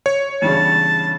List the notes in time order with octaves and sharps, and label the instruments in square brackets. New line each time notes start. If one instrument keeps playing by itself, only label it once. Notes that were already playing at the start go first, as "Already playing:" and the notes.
[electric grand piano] C#5
[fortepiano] E2 G2 C#3 [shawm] A5